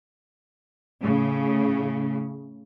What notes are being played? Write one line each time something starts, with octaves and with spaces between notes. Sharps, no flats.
A2 C#3